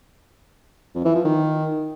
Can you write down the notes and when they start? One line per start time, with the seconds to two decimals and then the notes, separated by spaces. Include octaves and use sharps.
0.95 F2
1.05 E3
1.15 F3
1.25 D#3